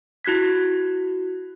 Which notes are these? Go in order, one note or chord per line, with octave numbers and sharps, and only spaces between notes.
E4 F#4 F#6 G#6 B6